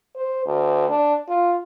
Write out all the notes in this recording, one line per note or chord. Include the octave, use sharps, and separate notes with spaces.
C5
D2
D4
F4